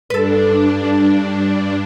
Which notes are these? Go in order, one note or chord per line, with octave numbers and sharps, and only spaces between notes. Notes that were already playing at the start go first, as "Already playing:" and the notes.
G2 D4 A4 B4